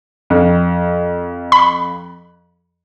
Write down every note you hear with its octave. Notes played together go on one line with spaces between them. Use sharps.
F2
B5